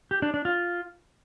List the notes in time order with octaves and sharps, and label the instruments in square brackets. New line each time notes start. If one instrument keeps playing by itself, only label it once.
[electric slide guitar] G4
D4
D4
F4